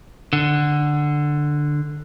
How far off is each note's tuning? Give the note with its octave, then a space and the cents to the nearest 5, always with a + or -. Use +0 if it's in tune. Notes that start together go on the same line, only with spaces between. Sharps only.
D3 +10